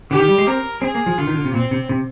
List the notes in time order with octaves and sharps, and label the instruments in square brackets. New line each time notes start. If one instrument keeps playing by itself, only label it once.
[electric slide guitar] D3 [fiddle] G4
[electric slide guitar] D#3
G3
G#3
[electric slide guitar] C4 [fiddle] A#4
[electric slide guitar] C4 [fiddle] G#4
[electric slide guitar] A#3
F3
[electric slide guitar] D3 [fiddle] F4
[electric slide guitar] D#3
D3
C3
[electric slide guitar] A#2 [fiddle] C4
[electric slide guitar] C3
C3